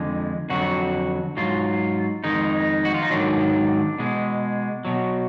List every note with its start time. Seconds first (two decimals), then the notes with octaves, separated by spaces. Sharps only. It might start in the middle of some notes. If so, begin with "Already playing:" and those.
Already playing: F2 D3 G#3
0.50 F2 D3 F#3 F#4
1.37 G#2 F#3 F4
2.24 F2 D#3 G#3 D#4
2.85 F#4
2.94 F4
3.02 D#4
3.10 G#2 D#3 F#3 D4
3.99 B2 G#3
4.85 B2 F#3